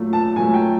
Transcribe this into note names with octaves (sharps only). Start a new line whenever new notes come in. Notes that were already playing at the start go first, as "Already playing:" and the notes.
Already playing: A#2 F#3 A3
A5
A#2 F#3 A3 G#5
G5